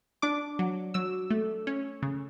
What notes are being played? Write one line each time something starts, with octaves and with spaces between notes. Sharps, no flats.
D4 D6
F#3
F#3 E6
A3
C#4
C#3